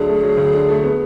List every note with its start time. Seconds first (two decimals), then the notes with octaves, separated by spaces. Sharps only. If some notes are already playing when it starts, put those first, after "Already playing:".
Already playing: D2 D3 F#3 G#4
0.08 A3
0.23 F#3
0.37 D2
0.53 D3
0.69 A3
0.83 B3